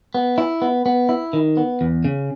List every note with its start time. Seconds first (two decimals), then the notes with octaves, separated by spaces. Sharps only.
0.15 B3
0.38 E4
0.62 B3
0.86 B3
1.09 E4
1.33 D#3
1.57 B3
1.81 E2
2.05 C#3